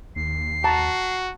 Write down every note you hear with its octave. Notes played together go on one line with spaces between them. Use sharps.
D#2 C7
F#4 A5 A#5